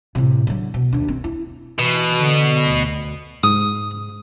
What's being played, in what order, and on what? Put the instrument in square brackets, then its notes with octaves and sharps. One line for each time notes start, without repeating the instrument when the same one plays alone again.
[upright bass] A2 C3
D3 F#3
B2
D#2 D4
C4
E4
[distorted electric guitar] B2 [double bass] E3
[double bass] D3
D2
[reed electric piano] G#2 [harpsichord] D#6